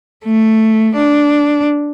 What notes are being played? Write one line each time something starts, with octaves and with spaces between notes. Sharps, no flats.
A3
D4